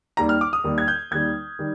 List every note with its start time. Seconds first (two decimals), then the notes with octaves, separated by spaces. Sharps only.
0.17 D#2 D#3 G3 A#5
0.29 F6
0.41 D6
0.53 D#6
0.64 D#2 D#3 G3
0.78 G#6
0.88 G6
1.11 D#2 D#3 G3 G#6
1.59 D#3 G3